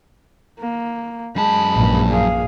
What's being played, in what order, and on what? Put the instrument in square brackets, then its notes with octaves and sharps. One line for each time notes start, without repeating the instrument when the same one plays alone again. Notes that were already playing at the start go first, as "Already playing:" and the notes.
[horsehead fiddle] A#3
[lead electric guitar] F#2 A5 [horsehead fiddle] G#3 B5
[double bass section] A#1 G2 A#2
[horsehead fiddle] G#4 F5